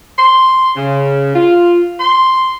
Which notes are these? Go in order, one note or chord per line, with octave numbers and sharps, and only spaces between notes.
C6
C#3
F4
C6